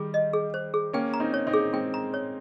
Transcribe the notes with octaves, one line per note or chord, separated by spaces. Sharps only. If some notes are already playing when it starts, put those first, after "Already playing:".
Already playing: D#3 G3 G#4
D#5
G#4
C5
G#4
A#3 C#4 G5
A#5
C4 D#4
C#5
C4 D#4
G#4
G#3 C4 G5
A#5
C#5